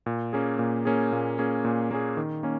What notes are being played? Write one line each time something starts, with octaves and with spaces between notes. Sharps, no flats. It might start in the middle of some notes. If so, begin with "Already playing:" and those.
A#2
A#3 C#4 G#4
A#2
A#3 C#4 G#4
A#2
A#3 C#4 G#4
A#2
A#3 C#4 G#4
D#3
A#3 C#4